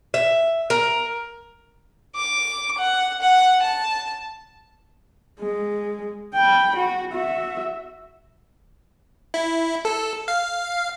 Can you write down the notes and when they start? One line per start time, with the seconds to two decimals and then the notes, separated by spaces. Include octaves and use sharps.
0.14 E5
0.70 A#4
2.15 D6
2.77 F#5
3.21 F#5
3.62 A5
5.39 G#3
6.34 G5 B5
6.76 F#4
7.13 F#4 E5
9.34 E4
9.85 A4
10.28 F5